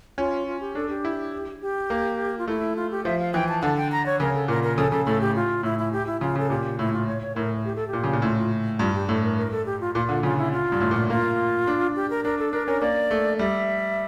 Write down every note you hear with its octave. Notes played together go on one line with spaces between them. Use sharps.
C#4 F4
F4
G4
D4 A4
G4
E4
G4
A#3
F4
A3 E4
F4
G4
F3 E5
F5
E3 G5
A5
D3 A5
G5
A#5
C#5
C#3 A#4
A4
A#2 A#4
A#4
C#3 A4
C#3 A4
A2 A4
G4
F4
A2 E4
E4
G4
E4
C#3 F4
C#3
A4
A#2 G4
A2 E4
F4
C#5
C#5
A2 A#4
G4
A4
G4
A#2
C#3
A#2
A2 F4
F4
G2 F4
G4
A2 A4
A#4
A#4
A4
G4
F4
A#2 F4
D3
C#3 F4
E4
F4
G2
A2
A#2
A#3 F4
D4
G4
A#4
D4 A#4
A4
D4 A#4
C#4 A#4
A#3 D5
A3
G3 E5